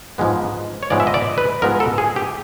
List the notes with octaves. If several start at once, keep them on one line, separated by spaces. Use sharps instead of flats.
G#2 F3 G#3 B3
C#5
G#2 F3 G#3 B3 D5
E5
D#5
D5
B4
G#2 F3 G#3 B3 A#4
A4
G#4
G4